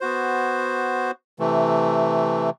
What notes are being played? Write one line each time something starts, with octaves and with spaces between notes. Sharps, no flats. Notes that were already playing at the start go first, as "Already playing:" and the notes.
B3 F#4 C5
C3 E3 A3